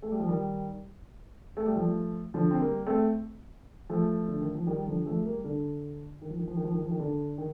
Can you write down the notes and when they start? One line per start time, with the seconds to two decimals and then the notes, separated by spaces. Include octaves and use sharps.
0.02 A3
0.11 G3
0.20 F3
0.28 D#3 G3
1.57 A3
1.66 G3
1.76 F3 A3
2.34 D3 F3
2.51 C4
2.60 G3 A#3
2.86 A3 C4
3.89 F3 A3
4.28 D3
4.41 D#3
4.55 F3
4.67 D#3 G3
4.87 D3 F3
5.06 F3 A3
5.25 G3 A#3
5.44 D3
6.22 D#3
6.30 F3
6.39 D#3
6.48 F3
6.56 D#3
6.64 F3
6.74 D#3
6.82 F3
6.91 D#3
7.00 D3
7.38 D#3